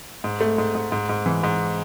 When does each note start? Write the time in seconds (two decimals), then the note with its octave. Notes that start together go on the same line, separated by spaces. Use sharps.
0.24 G#2
0.41 A3
0.58 G#2
0.75 G#2
0.92 G#2
1.09 G#2
1.26 E3
1.43 G#2